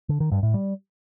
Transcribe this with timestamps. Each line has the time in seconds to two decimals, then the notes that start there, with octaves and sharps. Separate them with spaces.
0.09 D3
0.20 D#3
0.32 G2
0.43 A2
0.54 G3